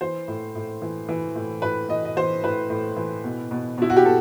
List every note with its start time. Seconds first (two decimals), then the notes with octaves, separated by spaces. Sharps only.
0.01 E3 C5
0.28 A2
0.55 A2
0.82 E3
1.09 E3
1.35 A2
1.62 A2 B4
1.89 E3 D#5
2.05 D#5
2.16 E3 C5
2.43 A2 B4
2.70 A2
2.96 E3
3.24 B2
3.51 B2
3.78 B2 E4
3.90 F#4
3.97 G4
4.05 B2 A4